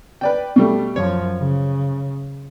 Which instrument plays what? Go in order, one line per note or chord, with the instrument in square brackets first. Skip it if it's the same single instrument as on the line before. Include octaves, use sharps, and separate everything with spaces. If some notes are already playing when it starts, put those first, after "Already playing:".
[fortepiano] B4 D5 G5
B2 G3 A3
[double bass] F#2 F3 [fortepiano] C#5
[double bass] C#3